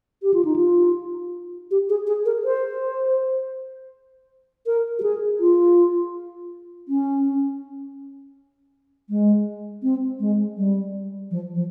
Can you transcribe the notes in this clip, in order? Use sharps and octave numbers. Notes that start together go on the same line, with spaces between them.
G4
F4
D#4
F4
G4
G#4
G#4
A#4
C5
A#4
G4
G#4
F4
C#4
G#3
C4
G#3
G3
F3
F3